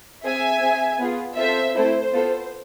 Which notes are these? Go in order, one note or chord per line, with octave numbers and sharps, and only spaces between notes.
C4 G#4 E5 G#5
C4 G#4
B3 F4 G#4
C4 F4 A4 C5 E5
A3 C4 E4 A4 C5
B3 F4 A4